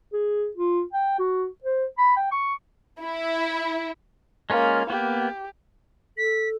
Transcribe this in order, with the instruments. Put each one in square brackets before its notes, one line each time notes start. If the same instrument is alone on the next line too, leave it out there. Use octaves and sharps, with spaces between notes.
[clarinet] G#4
F4
G5
F#4
C5
B5
G5
C#6
[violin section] E4
[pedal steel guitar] G#3 C#4 F4 [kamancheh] A#3 F5
[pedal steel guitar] A#3 B3 [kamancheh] G4
[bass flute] A4 [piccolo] B6